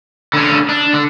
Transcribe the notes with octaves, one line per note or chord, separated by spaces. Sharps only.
D3 C#4
D4
D3